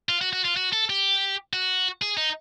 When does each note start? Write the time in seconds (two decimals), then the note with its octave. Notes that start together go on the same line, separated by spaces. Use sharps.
0.09 F4
0.21 F#4
0.33 F#4
0.45 F4
0.57 F#4
0.73 A4
0.90 G4
1.53 F#4
2.02 G#4
2.17 D#4